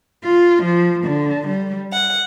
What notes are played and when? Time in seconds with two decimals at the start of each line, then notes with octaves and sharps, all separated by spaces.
0.24 F4
0.62 F3
1.04 D3
1.47 G3
1.92 F#5